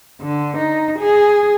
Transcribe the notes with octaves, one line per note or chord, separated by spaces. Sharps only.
D3
D#4
G#4